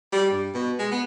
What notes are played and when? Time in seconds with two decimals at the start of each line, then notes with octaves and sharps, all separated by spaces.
0.13 G3
0.30 G2
0.54 B2
0.79 G#3
0.91 B3